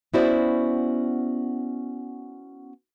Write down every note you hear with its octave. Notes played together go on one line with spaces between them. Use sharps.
B3 C#4 E4 F#4 C5 D5